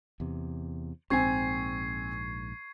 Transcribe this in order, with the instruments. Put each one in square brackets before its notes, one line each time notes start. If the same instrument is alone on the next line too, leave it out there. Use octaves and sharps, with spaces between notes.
[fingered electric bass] E2 C3
[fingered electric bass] A#1 G#2 [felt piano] C4 G#5 [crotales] C#6 G#6 C7